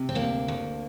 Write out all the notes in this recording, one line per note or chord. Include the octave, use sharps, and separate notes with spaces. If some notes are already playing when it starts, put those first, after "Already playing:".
Already playing: C3
C4
D2 A#3
D2